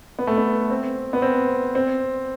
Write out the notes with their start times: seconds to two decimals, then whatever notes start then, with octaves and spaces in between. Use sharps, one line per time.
0.19 B3
0.27 A3
0.38 B3
0.70 C4
1.13 B3
1.22 C4
1.75 C4